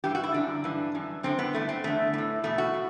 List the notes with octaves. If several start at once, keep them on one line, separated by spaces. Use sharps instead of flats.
G2 E3 G4
F#4
E4
F#2 D3 D4
G2 E3
F#2 E3
F#2 D3 C4
B3
G2 E3 A3
C4
E2 D3 A3
A2 E3
E2 B2 A3
F#4
A2